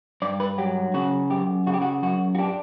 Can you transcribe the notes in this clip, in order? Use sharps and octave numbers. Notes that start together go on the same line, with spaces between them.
G2 D5
B4
F#3 G4
C#3 F#4
F#2 G4
C#3 F#4
G4
F#4
F#2 F#4
F#4
D4 G4